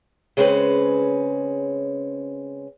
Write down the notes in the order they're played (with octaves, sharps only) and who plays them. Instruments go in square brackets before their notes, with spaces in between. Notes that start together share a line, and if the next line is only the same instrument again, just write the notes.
[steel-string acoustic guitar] C#3 G#3 C4 C#4 E4 B4